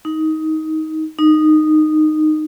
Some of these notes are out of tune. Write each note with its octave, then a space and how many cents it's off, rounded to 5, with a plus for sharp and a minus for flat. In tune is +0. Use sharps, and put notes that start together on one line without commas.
D#4 +15
D#4 -15